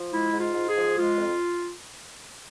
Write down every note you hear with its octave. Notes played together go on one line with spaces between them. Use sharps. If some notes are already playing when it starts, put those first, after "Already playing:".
Already playing: F3
G#3 E4
G#2
F4
G#2
G#4
F3
G#3 F4
F2